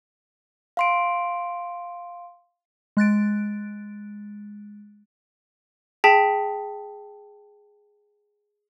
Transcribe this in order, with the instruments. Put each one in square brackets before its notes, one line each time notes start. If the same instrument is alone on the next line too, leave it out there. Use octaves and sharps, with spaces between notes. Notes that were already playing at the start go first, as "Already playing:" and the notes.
[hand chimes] F5 C6 D7
[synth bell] G#3 F#6 A6 D7
[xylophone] G#4 G5 A5 B6